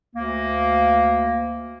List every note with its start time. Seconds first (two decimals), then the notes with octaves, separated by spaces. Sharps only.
0.16 D2 A#3